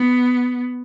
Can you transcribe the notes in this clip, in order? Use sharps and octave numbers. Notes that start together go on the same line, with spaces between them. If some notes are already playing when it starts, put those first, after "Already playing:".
Already playing: B3